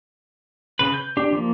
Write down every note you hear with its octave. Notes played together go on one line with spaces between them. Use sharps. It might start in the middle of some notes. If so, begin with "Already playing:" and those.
C#3 B4
G6
D4 G4
F3 A#3